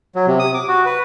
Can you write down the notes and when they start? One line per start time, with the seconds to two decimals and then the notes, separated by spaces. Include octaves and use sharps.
0.15 F#3
0.27 C3
0.39 D#6
0.54 D6
0.68 F#4
0.86 B4